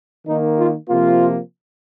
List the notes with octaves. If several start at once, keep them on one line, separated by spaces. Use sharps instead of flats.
D#3 A#3 D#4
F4
C3 F3 A#3 F4